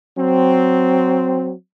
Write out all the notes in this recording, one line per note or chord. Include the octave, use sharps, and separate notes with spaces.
F#3 C4